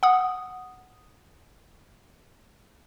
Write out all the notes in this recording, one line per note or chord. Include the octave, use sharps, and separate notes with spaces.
F#5 D#6